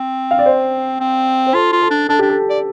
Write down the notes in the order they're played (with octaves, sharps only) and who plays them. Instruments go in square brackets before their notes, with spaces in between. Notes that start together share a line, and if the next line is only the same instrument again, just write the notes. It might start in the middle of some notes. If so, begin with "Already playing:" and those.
Already playing: [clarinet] C4
[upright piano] F5
D5
C5
[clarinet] C4
[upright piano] C5
[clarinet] F4 [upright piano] A4
[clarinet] F4
[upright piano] A4
[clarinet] D4
[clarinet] D4 [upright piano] A4
[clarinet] D4 [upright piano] G4
[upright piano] A4
[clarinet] D5